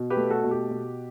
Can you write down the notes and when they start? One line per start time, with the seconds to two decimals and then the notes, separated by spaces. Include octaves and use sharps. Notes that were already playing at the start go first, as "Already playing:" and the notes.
Already playing: B2
0.10 G4 B4
0.17 A3
0.30 F#4 A4
0.44 B2
0.51 G4
0.71 B2